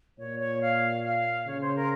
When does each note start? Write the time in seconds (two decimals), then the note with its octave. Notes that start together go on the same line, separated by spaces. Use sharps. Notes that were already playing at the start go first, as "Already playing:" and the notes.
0.18 A#2 C#5
0.40 C#5
0.61 F5
1.04 F5
1.47 C#3 C#5
1.61 C5
1.76 A#4